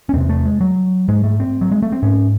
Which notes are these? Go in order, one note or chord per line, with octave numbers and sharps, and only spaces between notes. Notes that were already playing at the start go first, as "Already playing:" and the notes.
C#4
E2 C3 C4
A3
G#3
F#3
G#2 G#3
A3
C4
F#3
G#3
A3
C4
G#2 C#4